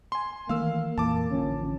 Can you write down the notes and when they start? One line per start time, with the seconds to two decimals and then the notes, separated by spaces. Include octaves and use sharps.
0.12 G#5 C6
0.49 D#3 E3 A3 A#3 F5 E6
0.98 F2 A#2 E3 A#3 A5 D6
1.31 A1 D3 F3 C#4